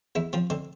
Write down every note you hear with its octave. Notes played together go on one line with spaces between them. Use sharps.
E2 E4
F3 C4
D3 C4